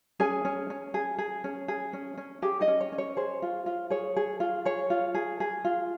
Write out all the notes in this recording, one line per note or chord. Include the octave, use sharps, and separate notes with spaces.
C#4 G#4 G#5
C#4
C#4
G#4
G#4
C#4
G#4
C#4
C#4
G4 G#4 G5
D#4 D#5
C#4
C#5
C#4
C#5
G#4 C5
F4
F4
G#4 C#5
G#4
F4
G#4 C#5
F4
G#4
G#4
F4